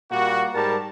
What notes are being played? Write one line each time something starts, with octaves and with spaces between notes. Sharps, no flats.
A#2 G3 A#3 F#4
G#2 G3 A#4 A5